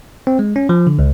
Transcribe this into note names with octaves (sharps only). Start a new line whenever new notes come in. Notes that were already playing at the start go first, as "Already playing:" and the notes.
C4
G#3
C#4
F3
D3
C#2